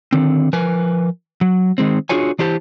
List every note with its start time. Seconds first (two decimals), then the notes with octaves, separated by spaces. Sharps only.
0.12 D3 D#3 C4
0.53 F3 A#4 B4 G#5
1.41 F#3
1.78 D#3 G#3 C4
2.09 D4 F4 F#4 G#4 C#5 G#5
2.39 E3 D4 E4 G4 C5 A5